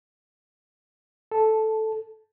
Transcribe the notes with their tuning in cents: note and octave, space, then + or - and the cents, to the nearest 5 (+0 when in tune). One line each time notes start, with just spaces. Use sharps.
A4 -5